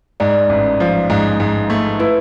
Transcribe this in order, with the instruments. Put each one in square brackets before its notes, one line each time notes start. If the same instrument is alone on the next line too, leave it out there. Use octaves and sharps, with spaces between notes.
[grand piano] G#2 [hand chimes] D5
[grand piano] A1
F3
[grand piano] G#2 [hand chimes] D#5
[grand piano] G#2
A3
[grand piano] E4 [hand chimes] B4